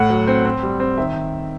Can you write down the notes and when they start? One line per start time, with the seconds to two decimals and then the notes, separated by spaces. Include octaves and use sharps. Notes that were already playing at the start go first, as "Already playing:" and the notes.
Already playing: A2 F#5
0.10 F#3
0.27 C4
0.45 C4
0.63 G3
0.80 C4
0.98 D#3 E5